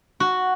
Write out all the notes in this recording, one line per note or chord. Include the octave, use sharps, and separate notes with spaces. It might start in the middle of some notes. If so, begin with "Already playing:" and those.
F#4